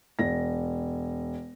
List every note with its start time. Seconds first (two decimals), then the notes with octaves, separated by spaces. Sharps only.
0.19 E1 A#6